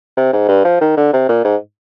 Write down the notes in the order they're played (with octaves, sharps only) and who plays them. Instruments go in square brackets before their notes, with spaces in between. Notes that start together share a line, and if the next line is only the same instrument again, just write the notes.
[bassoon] C3
G#2
G2
F3
D#3
D3
C3
A#2
G#2